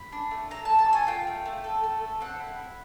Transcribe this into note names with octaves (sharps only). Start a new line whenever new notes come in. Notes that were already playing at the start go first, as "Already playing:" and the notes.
Already playing: B5
D4
A3
A4 A#5
A4 A5
A5
F#4 G#5
F4 G5
A3
A3
A4
A3
A4
C4 F#5
E4
E4